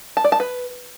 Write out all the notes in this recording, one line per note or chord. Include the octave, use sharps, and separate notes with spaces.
A5
D5
A5
B4